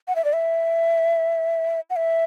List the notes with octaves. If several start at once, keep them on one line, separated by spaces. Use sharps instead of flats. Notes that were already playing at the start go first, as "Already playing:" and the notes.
F#5
E5
D5
E5
F#5
E5